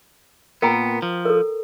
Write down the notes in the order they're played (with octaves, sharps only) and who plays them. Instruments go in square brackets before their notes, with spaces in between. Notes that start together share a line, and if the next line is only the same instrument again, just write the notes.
[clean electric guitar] A#2 B3 [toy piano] A#4 G5 A#5
[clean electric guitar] F3
[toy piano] A4 A#4